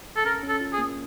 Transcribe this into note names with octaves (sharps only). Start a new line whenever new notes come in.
A4
C#4 A#4
C#4
A4
F4
G#4
A#3